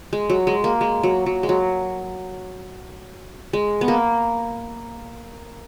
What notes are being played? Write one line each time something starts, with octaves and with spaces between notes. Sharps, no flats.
G#3
F#3
G#3
A#3
G#3
F#3
F#3
G#3
F#3
G#3
B3
A#3